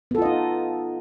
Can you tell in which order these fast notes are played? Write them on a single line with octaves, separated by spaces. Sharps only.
B3 A4 F4 D#5 D#4